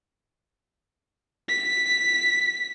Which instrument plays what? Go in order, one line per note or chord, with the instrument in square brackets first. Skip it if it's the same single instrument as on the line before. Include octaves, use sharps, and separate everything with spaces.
[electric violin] B6